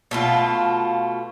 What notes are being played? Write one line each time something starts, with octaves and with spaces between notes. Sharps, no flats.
B2 A3 F4